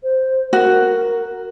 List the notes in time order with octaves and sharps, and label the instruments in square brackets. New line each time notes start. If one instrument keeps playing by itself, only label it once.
[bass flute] C5
[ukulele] F#4 [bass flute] A#4